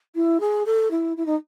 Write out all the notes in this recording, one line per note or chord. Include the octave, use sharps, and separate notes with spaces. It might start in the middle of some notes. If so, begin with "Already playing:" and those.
E4
G#4
A4
E4
E4
D#4